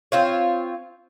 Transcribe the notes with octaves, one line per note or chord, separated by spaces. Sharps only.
C4 F4 C#5